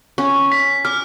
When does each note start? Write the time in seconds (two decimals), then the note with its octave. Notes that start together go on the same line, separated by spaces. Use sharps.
0.18 C#4
0.52 B6
0.85 D6 F6